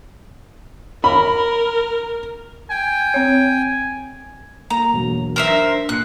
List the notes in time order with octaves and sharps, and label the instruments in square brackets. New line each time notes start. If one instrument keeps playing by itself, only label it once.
[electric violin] A#4 [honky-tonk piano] B5
[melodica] G5 [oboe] G#5
[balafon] C4 C#5
[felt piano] A#3 [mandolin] A#5
[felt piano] E1 F#3 A#3
[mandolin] A#4 C5 E5
[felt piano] D4 A#6
[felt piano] A#2 C7 C#7 [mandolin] F#6